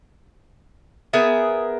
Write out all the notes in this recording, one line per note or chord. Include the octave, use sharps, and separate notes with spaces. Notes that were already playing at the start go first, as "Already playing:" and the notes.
B3 G#4 A#4 E5